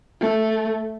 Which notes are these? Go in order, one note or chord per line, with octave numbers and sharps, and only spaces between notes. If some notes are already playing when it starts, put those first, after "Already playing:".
A3